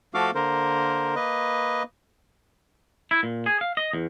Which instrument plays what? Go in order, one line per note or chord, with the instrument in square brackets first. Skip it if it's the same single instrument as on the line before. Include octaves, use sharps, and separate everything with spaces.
[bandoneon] F3 A3 F#4 A4 F5 D6
D3 A#3 A#4 C5
A#3 B4 D#5
[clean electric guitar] E4
A#2
G#4
F5
D#5
E2